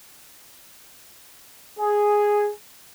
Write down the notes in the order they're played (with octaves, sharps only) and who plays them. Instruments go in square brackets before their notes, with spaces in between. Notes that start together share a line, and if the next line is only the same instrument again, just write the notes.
[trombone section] G#4